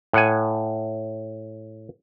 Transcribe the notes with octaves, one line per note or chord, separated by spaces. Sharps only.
A2 F#5 G#5